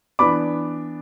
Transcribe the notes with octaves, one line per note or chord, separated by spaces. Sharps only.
E3 B3 D4 B5 D6